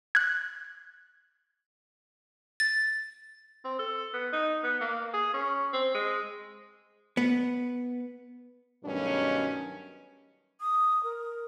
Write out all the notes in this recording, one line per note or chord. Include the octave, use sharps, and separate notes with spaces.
F#6 G#6
A6
C4
A4
B3
D#4
B3
A#3
G#4
C#4
C4
G#3
B3
G2 B2 D#3 F#3 A3 C#4
D#6
A#4